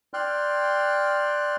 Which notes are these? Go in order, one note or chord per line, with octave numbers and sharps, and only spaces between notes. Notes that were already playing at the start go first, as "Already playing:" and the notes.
D5 G5 C6 F6 F#6